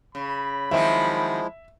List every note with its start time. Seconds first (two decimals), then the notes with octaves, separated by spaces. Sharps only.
0.15 C#3 B5
0.71 D#3 F3 F#3 G#3 C4 E4 E5